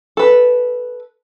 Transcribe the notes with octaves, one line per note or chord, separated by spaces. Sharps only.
A4 B4